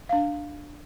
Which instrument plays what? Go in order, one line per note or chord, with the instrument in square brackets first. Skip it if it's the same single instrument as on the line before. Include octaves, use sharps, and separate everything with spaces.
[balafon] D4 F5